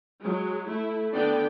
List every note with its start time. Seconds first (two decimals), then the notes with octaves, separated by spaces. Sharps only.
0.20 F#3 G#3
0.68 A3 E4
1.13 D3 B3 D5 G5